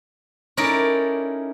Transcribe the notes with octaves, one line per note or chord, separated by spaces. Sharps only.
C#4 D#4 E4 A4 A#4 D5